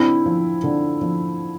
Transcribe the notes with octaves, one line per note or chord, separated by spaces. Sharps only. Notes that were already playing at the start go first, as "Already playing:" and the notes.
Already playing: D3 C4 E4
F3
D3
F3